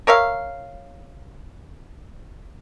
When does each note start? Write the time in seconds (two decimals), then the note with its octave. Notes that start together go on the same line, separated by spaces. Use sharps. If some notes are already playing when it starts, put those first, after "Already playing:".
0.07 A#4 C#5 E5 F5